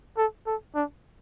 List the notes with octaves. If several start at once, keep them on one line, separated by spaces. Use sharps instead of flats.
A4
A4
D4